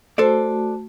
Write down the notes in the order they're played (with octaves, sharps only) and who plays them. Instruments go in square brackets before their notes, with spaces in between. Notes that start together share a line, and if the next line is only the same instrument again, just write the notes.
[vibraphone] A3 F#4 A5 [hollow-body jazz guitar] A4 C5 D5